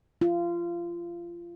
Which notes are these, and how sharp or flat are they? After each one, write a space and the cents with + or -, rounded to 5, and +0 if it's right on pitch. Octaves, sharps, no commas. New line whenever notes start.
F4 -25